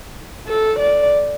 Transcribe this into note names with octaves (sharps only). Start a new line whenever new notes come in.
A4
D5